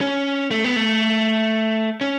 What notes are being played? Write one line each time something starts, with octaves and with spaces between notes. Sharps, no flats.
C#4
A3
B3
A3
C#4